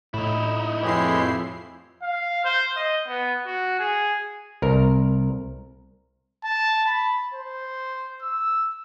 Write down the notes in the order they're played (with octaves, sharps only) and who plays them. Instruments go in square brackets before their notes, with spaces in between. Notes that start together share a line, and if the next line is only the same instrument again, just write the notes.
[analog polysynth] A2 [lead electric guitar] D#4 E4
[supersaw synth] F2 E4 C7 [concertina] G#3 G4 C#5 [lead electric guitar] B4 D#5
[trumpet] F5
C5
D#5
B3
F#4
G#4
[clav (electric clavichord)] C2 A#4
[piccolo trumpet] A5
B5
C5
E6